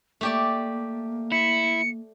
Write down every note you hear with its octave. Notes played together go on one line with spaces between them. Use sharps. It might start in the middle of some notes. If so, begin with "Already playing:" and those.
A3 A#3 G4 D5
E4 C#7